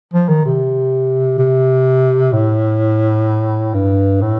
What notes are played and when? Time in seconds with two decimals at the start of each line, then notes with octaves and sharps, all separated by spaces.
0.14 F3
0.29 D#3
0.46 C3
1.39 C3
2.33 A2
3.74 G2
4.22 A2